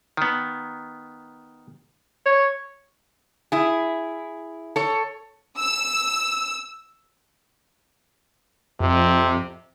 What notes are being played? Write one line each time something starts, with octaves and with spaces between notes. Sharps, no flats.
D#3 B3
C#5
E4 G#4
A4 C#5
E6
F2 C3